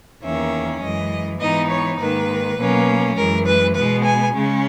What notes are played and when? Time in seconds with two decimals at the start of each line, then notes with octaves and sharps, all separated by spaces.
0.22 E2 D#3 A#3 C#4 E5
0.81 F#2 E3 G#3 D#5
1.40 G#2 E3 B3 D#4 D#5
1.70 C#5
1.99 G#2 D#3 A#3 B4
2.58 B2 F#3 A#3 C#4
3.17 F#2 E3 G#3 A#4
3.45 B4
3.75 B2 G#3 B3 B4
4.04 G#5
4.34 C#3 G#3 C#4